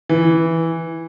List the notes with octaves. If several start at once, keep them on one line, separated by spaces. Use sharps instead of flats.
E3